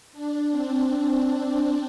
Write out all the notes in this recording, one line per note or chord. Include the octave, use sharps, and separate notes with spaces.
D4
C4